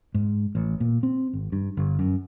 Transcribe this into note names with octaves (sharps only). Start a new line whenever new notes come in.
G#2
A1
A#2
C4
G#1
G2
G1
F#2